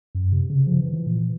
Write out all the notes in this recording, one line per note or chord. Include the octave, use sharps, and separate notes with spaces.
F#2
C3
C#3
F3
E3
E3
A#2